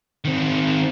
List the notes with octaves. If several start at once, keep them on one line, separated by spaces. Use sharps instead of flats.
D#3 C4